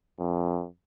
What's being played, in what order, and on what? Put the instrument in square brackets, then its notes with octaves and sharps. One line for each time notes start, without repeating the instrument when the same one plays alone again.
[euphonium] F2